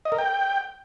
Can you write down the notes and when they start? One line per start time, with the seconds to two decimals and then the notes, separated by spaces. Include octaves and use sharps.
0.05 D#5
0.12 A#4
0.18 G5